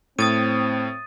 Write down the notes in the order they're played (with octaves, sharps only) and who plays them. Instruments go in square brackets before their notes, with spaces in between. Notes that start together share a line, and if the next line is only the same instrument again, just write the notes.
[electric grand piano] A2 [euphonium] C4 [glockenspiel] D#6 A6 D#7